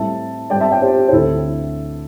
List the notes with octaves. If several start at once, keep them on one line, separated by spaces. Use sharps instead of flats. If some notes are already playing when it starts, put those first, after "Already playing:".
Already playing: A2 G3 C4 E5 A5
G2 G3 C4 D5 G5
E5 A5
D5 G5
G4 C5
G4
C5
D2 D3 C4 E4 A4